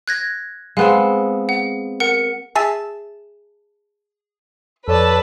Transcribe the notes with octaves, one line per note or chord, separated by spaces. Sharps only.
F#6 G#6 A#6
G#3 B3 C4 F5
F#5
A#4 F#5 C#7
G#4 E5 A5
F2 A4 B4 C#5 D5 A5